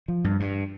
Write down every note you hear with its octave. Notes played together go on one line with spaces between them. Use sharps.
F3
G2
G2